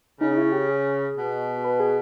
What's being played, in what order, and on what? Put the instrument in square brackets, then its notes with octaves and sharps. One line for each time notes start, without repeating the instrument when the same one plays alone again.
[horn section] C#3 [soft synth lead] D#4
[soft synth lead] D#4
E4
G4
G#4
[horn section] B2
[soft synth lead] B4
G#4